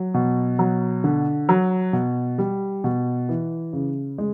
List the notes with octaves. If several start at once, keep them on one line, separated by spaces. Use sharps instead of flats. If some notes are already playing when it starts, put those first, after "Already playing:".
Already playing: F#3
B2
F#3
D3
F#3
B2
G3
B2
E3
C#3
G#3